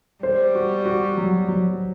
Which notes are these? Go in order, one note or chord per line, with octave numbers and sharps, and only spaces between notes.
G3 C5
F#4
F#4
F#3
F#3